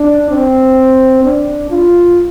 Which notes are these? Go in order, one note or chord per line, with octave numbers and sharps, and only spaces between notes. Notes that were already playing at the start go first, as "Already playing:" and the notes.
Already playing: D4
C4
D4
F4